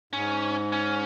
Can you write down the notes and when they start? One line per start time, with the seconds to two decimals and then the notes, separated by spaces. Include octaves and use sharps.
0.13 G#2 C#4
0.73 C#4